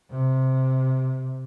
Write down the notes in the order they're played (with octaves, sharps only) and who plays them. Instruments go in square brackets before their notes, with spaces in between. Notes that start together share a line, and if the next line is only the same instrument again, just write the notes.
[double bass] C3